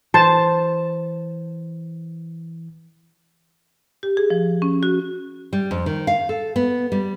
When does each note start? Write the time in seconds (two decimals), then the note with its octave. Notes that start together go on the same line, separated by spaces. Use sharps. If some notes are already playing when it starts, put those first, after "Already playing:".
0.14 E3 C5 A5
4.03 G4
4.17 G#4
4.30 F3
4.62 C#4
4.83 F#4
5.53 G3
5.71 F2
5.86 D#3
6.07 F5
6.29 A4
6.56 B3
6.92 G3